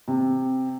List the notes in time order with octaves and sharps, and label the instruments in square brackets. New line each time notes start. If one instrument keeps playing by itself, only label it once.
[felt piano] C3